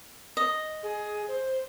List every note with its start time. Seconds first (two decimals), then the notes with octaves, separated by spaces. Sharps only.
0.37 D#5
0.83 G#4
1.28 C5